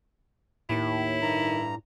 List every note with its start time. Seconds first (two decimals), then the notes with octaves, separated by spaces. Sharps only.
0.70 D#2 A2 E4
1.22 G2 D#3 A#5